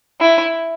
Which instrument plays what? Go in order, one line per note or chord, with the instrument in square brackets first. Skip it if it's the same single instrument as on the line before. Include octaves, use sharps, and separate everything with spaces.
[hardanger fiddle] E4